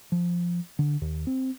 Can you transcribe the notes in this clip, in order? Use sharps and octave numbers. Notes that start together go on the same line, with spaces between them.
F3
D3
D#2
C4